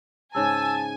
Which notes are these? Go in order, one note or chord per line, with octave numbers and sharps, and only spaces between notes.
G#2 C#3 G#4 G#5 A5 E6